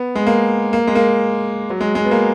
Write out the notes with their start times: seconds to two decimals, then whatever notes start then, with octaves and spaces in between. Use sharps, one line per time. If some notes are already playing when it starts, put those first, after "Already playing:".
Already playing: B3
0.15 G#3
0.27 A#3
0.73 A#3
0.87 G#3
0.95 A#3
1.70 F#3
1.81 G#3
1.95 G#3
2.05 B3
2.11 A#3